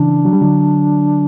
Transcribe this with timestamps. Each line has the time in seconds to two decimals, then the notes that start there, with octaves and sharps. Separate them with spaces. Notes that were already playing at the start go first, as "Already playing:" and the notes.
Already playing: C#3 E3 D4
0.25 F#3
0.33 G3
0.41 D3 F#3